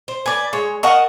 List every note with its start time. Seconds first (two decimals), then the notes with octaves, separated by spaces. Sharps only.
0.08 C5
0.26 B4 D5 G#5
0.53 G#3 C#5
0.83 A#4 D#5 F#5 A5 C#6